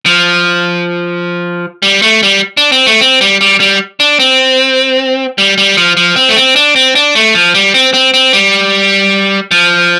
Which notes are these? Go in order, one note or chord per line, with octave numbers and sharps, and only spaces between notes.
F3
G3
A3
G3
D4
C4
A3
C4
G3
G3
G3
D4
C4
G3
G3
F3
F3
C4
A3
C4
D4
C4
D4
A3
F3
G3
C4
C4
C4
G3
F3